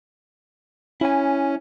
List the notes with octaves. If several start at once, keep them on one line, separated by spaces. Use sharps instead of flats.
C#4 E4 G#5